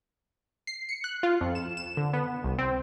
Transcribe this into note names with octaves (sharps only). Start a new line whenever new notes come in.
C7
C#7
F#6
F4
F2
E7
E7
D3
B3
C2
C4